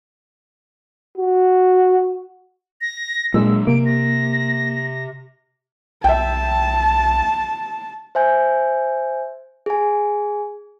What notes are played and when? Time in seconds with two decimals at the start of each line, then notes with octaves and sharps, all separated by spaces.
1.17 F#4
2.81 A#6
3.34 A#2 F#3 G#3 D4 E6
3.67 C3 A#3 D7
3.86 A#6
6.04 B1 E5 G5 A5
8.15 C5 E5 G#5 G6
9.66 G#4 G#5